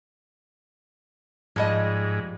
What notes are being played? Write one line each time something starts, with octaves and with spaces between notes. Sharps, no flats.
G#2 F3 G3 D#5